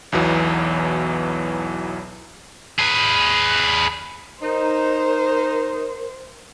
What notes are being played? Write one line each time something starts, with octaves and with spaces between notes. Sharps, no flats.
B1 E2 B2 E3 F#3
G#4 B4
D#4 A#4 C5